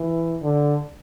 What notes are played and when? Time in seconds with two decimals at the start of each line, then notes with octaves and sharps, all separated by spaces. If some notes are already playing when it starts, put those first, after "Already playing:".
Already playing: E3
0.43 D3